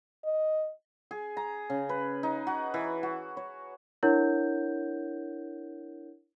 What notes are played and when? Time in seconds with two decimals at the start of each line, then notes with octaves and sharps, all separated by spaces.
0.24 D#5
1.11 G#4
1.37 A#5
1.70 C#3
1.89 B4
2.23 D#4
2.47 F#4
2.74 E3
3.03 F#4
3.37 C#5
4.03 D4 E4 A#4 C#5 F#5 G6